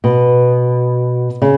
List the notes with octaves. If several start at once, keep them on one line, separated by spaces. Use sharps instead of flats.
B2
C#3